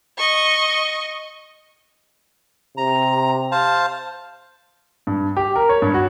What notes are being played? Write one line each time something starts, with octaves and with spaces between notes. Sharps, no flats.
D#5 C#6
C3 A#5
C5 F5 A5
G2
G4
A#4
C#5
G2
F#4